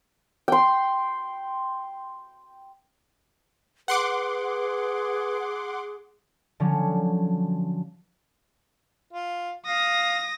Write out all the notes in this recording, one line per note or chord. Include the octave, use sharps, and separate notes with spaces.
G5 C6
G#4 B4 F#5 C6 D6
D3 F3 F#3 C#4
F4
F5 D#6 A#6